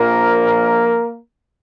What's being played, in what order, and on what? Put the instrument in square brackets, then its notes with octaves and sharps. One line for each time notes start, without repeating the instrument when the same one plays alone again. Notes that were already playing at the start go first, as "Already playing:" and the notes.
Already playing: [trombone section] A#1 A#2 F3 A#3 A#4